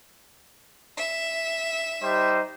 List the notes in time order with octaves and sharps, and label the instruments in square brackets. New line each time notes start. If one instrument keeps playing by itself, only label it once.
[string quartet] E5
[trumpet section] G3 D#4 C5